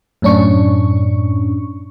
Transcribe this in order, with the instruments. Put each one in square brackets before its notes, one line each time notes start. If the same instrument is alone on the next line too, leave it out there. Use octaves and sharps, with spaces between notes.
[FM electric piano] F#2 A2 C#4 D4 C#6